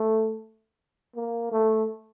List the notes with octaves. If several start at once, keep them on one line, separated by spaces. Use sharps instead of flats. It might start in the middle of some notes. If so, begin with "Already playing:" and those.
Already playing: A3
A#3
A3